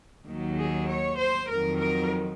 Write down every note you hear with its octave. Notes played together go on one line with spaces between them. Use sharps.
D#2 D#3 F#3
G#4
C#5
C5
F2 D#3 F#3 A#4
A#4